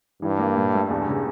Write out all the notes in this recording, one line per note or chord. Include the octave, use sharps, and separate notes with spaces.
G2 E3
A#3
A#2
A3
E2 G2
C#3